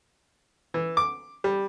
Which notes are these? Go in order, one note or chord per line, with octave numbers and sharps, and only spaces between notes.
E3
D6
G3